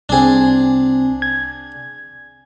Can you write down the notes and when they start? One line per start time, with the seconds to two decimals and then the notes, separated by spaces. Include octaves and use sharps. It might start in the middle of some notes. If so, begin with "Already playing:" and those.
0.09 C2 C4 D4 G#4
1.22 G#6